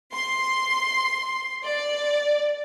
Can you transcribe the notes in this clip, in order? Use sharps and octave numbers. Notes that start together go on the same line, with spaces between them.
C6
D5